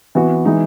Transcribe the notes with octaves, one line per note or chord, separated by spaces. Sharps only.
E3 B3 F#4
E3 G#3 D#4 G#4